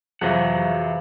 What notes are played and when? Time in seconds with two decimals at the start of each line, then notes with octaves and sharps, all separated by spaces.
0.21 F2 C3 E3 F#3 G#4 C5 F5 F#5